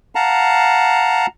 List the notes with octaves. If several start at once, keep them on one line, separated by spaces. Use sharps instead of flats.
F5 F#5 A5 A#5